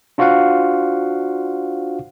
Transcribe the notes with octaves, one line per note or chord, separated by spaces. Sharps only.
D4 F4 F#4 C5 F5 F#5